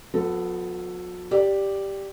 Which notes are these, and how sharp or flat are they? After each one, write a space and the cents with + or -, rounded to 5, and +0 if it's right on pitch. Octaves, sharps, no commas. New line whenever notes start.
F#3 -45 B3 +10 A4 +5
G4 +0 D5 +0